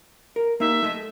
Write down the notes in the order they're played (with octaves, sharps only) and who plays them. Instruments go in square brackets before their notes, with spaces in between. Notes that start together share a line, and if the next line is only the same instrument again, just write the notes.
[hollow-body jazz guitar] A#4
[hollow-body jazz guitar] A#3 D#4 [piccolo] E5
[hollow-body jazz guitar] A3 D#5